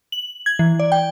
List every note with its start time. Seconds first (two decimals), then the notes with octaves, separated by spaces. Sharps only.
0.12 F#7
0.46 G#6
0.59 E3
0.79 D5
0.92 G5